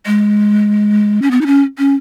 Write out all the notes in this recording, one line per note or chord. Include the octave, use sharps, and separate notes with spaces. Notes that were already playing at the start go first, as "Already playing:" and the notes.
G#3
C#4
B3
D#4
C#4
C#4